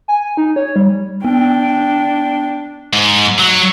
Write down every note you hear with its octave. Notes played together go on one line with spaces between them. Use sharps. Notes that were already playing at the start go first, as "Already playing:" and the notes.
G#5
D#4
C#5
G3
B3 D4 G5
G#2
F#3